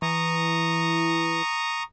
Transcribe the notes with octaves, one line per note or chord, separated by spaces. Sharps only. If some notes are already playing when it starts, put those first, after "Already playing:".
E3 A#5 C#6 D#6